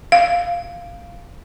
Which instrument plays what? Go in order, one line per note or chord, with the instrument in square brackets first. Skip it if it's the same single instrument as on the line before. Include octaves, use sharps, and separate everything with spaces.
[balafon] F5